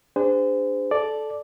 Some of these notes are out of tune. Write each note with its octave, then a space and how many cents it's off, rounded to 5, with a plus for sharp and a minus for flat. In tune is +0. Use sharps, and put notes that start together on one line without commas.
D4 +0 G#4 -30 C5 -35
A4 -15 D5 +0